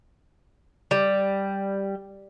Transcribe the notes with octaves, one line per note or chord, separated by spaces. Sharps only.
G3